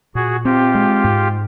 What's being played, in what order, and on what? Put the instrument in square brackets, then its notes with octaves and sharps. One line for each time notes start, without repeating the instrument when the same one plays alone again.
[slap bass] A#2 [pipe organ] F#4 G#4
[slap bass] C4 [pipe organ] F4 G4
[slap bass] G#3
G#2